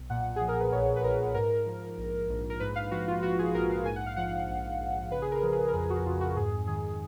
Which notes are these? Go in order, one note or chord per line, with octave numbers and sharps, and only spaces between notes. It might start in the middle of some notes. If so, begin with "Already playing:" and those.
Already playing: B1
A#2 F#5
F3 G#4
A#4
B4
A#1 C#5
B4
A#1 A#4
G#2 A#4
F3
A#1
A#1
A#4
G#2 B4
F5
F3 F#4
F4
A#1 F#4
G#4
A#1 A#4
F5
G#2 G#5
F#5
F5
F3 F#5
A#1
A#1
C#3 B4
G#4
A#4
F3
G#4
A#4
F2 G#4
F#4
F2 F4
F#4
G#2 G#4
D#3 G#4